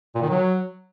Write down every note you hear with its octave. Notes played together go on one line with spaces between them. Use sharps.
A#2
D#3
F#3